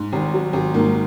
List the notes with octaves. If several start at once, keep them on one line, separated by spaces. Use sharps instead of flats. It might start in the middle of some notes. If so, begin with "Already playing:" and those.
Already playing: G#2
G#1
F#3
G#1
G#2 A#3